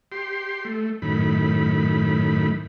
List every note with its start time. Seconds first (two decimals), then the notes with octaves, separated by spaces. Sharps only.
0.12 G4 C6
0.65 A3
1.02 F#2 A2 D#3 B5